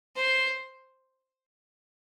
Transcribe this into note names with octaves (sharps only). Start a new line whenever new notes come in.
C5